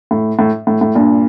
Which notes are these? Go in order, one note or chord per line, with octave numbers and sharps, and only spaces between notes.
A2
A2
A2
A2
G2 A#2